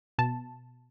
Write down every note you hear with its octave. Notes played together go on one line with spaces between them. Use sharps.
B2 A5